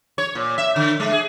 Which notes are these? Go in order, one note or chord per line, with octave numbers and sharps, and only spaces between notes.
C#5
A#2
E5
D3
G#3
G#4